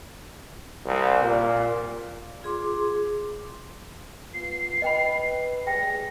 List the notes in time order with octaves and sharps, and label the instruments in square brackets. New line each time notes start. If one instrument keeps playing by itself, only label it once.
[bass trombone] C2
A#2
[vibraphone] F4 G#4 C6 D6
[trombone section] B3 F4 [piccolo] C7
[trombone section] B4 [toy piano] D#5 G5 B5
[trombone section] G3 G#3 G#4 [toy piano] G5 [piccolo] A#6